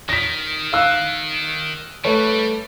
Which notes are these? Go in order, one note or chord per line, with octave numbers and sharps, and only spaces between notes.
D#3 A#6 B6
F5 E6 F#6
G3 A3 B4 C#5